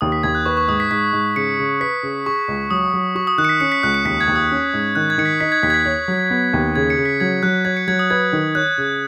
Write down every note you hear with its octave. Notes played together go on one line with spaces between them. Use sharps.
D#2 D#6
B6
D#2 G#6
F#6
B4 C#6
C#6
G#2 D#6
B6
G#2 B6
G#2
C#3 C#7
C#3
B4 B6
C#3
G#4 C#6
C#2
F#3 D#6
F#3
F#4 C#6
D#6
D#3 F#6
C#7
B6
C#4 C#7
B6
C#2 F#6
C#7
D#2 B6
G#6
D#2
D#6
C#4
G#2
D#3 F#6
G#6
D#3 C#7
B6
D#4 B6
G#6
D#2 B6
G#6
B6
C#5
F#3
B3
D#2
C#3 G#6
C#7
C#3
B6
F#3 G#6
F#3 F#6
C#5 G#6
C#7
F#3 G#6
D#6
B4 G#6
D#3
C#5 F#6
C#3